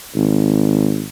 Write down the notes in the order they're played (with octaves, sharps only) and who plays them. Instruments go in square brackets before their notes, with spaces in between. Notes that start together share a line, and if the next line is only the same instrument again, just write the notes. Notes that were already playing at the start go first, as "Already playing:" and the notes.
[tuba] G#1